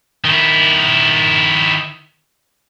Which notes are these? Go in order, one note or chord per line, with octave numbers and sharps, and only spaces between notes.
D#3 E4